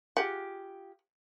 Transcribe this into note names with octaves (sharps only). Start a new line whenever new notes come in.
F4 G4 G#4 F#5